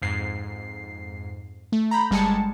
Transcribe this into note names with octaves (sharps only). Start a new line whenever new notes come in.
F2 G#2 C7
A3
A#5 B5 G6
G1 G3 G#3 G#5 A5 C#7